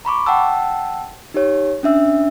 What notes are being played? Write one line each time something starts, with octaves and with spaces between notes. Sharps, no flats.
A#5 B5 C#6 D6
F#5 G5 A5 E6
D#4 G4 C#5
C#4 D4 E5 E6